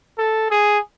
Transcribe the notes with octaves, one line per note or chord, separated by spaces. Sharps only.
A4
G#4